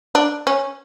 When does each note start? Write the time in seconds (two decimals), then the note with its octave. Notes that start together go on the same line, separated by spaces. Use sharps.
0.15 D4
0.47 C#4